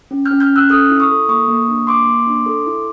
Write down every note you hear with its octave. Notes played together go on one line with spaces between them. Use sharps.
C#4
F6 G6
C#4
F6 G6
C#4
E6 F#6
A4 D#6 F6
E4
C#6 D#6
A4
A#3 C#6 D#6
A#3
D4
A#3 C6 D6
A#3
D4
A4
E4